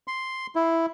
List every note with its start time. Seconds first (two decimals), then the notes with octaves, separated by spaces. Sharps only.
0.08 C6
0.56 E4